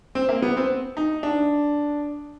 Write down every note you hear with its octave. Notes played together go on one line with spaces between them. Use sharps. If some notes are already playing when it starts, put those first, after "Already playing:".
C4
A#3
B3
C4
D#4
D4